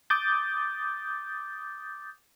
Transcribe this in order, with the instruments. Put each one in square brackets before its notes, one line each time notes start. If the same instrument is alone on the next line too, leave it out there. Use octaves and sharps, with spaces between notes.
[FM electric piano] D6 D#6 G6 A6